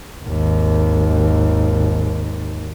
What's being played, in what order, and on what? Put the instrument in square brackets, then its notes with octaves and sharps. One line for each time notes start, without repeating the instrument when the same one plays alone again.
[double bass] G#1 D#2